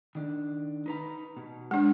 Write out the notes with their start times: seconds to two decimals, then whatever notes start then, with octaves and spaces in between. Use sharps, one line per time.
0.15 D#3 D4
0.86 D#4 B4 A#5
1.37 B2
1.71 G#3 D4